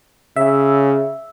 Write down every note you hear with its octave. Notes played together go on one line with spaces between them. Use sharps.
C#3 E5